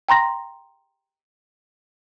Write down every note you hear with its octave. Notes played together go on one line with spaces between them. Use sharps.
G5 A#5 C6 A#6